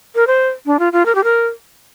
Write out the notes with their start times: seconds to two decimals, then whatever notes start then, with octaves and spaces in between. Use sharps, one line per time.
0.15 A#4
0.27 C5
0.66 D4
0.79 F4
0.93 F4
1.06 A#4
1.15 G4
1.24 A#4